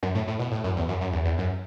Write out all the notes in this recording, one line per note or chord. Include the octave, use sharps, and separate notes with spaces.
F#2
A2
A2
B2
A2
F#2
E2
F#2
F#2
E2
E2
F#2